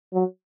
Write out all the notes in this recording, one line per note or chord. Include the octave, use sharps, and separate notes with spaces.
F#3